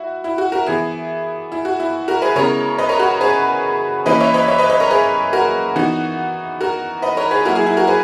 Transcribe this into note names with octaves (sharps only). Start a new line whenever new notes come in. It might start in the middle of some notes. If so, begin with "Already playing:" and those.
Already playing: E4 F#4
E4
F#4
F#4 A#4
E3 B3 E4 G#4
E4
F#4
E4
F#4 A#4
G#4 B4
C#3 G#3 B3 E4 A#4 C#5
B4 D#5
A#4 C#5
F#4
G#4 B4
E3 A#3 C#4 E4 B4 D#5
C#5 E5
B4 D#5
C#5 E5
B4 D#5
B4 D#5
A#4 C#5
G#4 B4
F#4 A#4
E3 B3 D#4 F#4
F#4 A#4
B4 D#5
A#4 C#5
G#4 B4
F#3 A#3 E4 F#4 A#4
E4 G#4
E4 G#4
F#4 A#4
G#4 B4